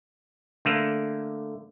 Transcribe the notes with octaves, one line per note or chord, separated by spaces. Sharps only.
D3 A3 A#3